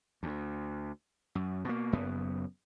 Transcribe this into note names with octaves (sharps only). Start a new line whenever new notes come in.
D2
F#2
B2 A#3
F#1 F#2 B3